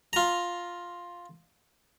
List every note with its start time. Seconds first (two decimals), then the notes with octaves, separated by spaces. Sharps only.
0.13 F4 A#5